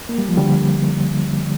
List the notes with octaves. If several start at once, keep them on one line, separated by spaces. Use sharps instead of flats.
A#3
G3
F3
D3 G3